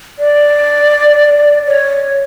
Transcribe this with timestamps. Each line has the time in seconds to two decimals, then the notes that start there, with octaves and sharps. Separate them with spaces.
0.19 D5
1.67 C#5